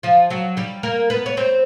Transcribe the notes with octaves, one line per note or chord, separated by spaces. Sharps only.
F3 F4
F#3 F#4
G3 G4
A#3 A#4
B3 B4
C#5
C4 C5